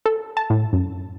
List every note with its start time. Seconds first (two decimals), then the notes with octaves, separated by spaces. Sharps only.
0.06 A4
0.37 A5
0.50 A2
0.73 F#2